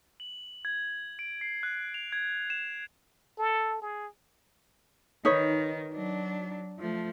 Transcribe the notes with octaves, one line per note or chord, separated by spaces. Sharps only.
F#7
G#6
D7
C7
F#6
F7
G#6
E7
A4
G#4
D#3 D#4 B4 C#5
F#3 D4
F3 A3